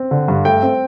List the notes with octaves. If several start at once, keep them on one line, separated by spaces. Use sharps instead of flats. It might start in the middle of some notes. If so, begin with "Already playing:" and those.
Already playing: C4
D3
G2
A3 G5
C4